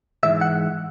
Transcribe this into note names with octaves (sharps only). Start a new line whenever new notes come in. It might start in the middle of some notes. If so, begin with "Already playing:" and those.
G#2 E3 G#3 E5
F#5